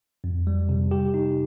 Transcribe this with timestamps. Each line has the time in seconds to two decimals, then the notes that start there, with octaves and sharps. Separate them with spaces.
0.24 F2
0.47 G3
0.69 C3
0.91 G4
1.14 D#4